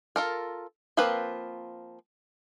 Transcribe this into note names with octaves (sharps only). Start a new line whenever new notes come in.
F4 A4 A#4
F3 A#3 C4 F4 B4